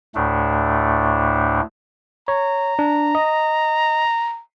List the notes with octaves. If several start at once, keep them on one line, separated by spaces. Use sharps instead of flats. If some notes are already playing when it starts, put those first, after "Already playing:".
D2 A2 A3 D4
C#5 A#5
D4
D#5